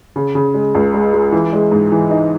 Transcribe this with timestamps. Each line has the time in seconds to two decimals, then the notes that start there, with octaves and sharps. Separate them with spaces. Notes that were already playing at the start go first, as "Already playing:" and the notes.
0.16 C#3
0.35 C#3
0.54 G#3
0.75 C#2
0.94 G#3
1.13 G#3
1.32 E3
1.53 G#3
1.72 G#2
1.92 E3
2.11 D#4